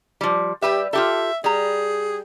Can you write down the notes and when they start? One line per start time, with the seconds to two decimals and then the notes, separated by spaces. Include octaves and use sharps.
0.21 F3 G3
0.62 G3 G4 B4 E5
0.93 F4 G4 A4 E5
1.44 G3 G#4 A#5